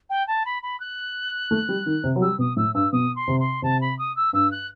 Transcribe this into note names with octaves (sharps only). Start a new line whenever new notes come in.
G5
A5
B5
B5
F#6
A3
G3
D#3
C3
F#3
G3 E6
B2 D#6
A2 E6
G2 E6
B2 D#6
C6
C3
C6
C3 A5
B5
D#6
E6
G2 E6
F#6